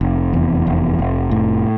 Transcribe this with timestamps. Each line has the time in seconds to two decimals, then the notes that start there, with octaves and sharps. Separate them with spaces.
0.01 F1
0.33 E2
0.67 F1
0.99 F1
1.31 A2